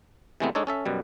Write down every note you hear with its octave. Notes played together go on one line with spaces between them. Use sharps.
C3 E3 G#3 A3 B3 C4
G#3 D4 D#4 A4 C#5
C#4 A4 E5
F#2 B2 G3